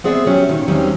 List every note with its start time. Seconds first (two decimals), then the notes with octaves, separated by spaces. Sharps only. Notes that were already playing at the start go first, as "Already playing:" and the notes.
0.04 B3 C4 G#4 D5 E5
0.26 F#3 C#4 G4
0.49 A#2 D#3
0.68 E2 D#3 F#3 G3 C4 C#4